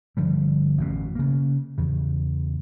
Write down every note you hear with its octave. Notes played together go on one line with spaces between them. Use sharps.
G1 D3 F3 G3
A1 F#2 B2
C#3 A#3
E2 C#3